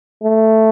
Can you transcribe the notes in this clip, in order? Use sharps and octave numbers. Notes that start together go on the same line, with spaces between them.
A3